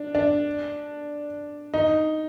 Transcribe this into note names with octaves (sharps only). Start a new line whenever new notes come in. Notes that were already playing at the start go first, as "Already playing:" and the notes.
Already playing: D4
D4
D#4